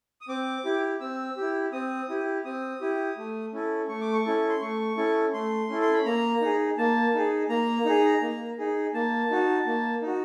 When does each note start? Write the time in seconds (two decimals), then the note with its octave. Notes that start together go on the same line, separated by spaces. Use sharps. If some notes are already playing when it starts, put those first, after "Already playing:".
0.21 D#6
0.28 C4 D6
0.64 E4 G4
1.00 C4 E6
1.37 E4 G4
1.72 C4 D#6
2.09 E4 G4
2.45 C4 D#6
2.81 E4 G4
3.17 A3
3.53 C#4 E4 A4
3.89 A3 C#6
4.01 D6
4.13 C#6
4.25 C#4 E4 A4
4.49 C6
4.61 A3 C#6
4.97 C#4 E4 A4
5.33 A3 C6
5.69 C#4 E4 A4
5.82 C6
5.94 B5
6.05 A#3 A#5
6.41 D#4 G#4
6.78 A#3 A5
7.14 D#4 G#4
7.49 A#3 A#5
7.85 D#4 G#4
8.22 A#3
8.58 D#4 G#4
8.94 A#3 A5
9.30 D#4 F#4
9.66 A#3
10.02 D#4 F#4